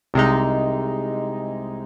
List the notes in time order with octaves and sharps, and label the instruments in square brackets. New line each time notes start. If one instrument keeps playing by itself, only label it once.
[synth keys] C2 C3 G#3 D#4